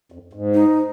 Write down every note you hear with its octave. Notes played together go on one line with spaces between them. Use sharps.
F2
G#2
D#4